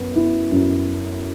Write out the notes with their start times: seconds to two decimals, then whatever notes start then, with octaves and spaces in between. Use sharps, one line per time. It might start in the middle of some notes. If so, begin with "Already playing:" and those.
Already playing: F#2 B3
0.16 E4
0.51 F#2